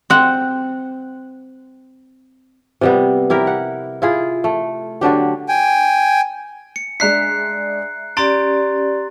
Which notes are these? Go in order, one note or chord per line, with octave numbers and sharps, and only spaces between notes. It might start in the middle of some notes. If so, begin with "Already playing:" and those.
C4 F#5
C3 G3 B3
E4 G4 A#4
F#5
E4 F4 G#4
A3
D3 F#3 D4 G4
G5 G#5
C#7
G#3 D4 E5 A#5 F#6 B6 C7
C#4 G4 D5 A#5 C6 A6 D7